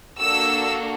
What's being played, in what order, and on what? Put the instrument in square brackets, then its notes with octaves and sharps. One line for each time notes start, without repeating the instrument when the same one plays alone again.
[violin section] A#3 D4 F#4 A4 E6